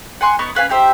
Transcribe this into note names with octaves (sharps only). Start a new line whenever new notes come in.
F#5 G#5 C6 F#6
B3 D#4 C#6
C#4 B4 F5 G#5
D#4 G4 C5 E5